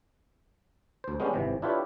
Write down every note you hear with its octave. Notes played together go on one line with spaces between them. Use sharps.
D2 C5
G#3 B3 C#4 D4 G4
G#1 C3 E3
D4 E4 F4 G4 B4 C#5